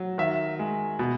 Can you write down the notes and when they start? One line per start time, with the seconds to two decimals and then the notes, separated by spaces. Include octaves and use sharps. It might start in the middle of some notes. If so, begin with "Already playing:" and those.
Already playing: F#3
0.18 D#3 E5
0.59 G#3
0.99 B2